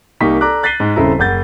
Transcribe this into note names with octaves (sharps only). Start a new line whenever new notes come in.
C2 A#3 D#4 G4 C#6 B6
A4 D5 A#5 D6 F#6
F#6 A6 B6 C7 D#7 G7
G#2
D#1 C#3 C4 E4 A4 A#5
F#1 F#5 G6 A6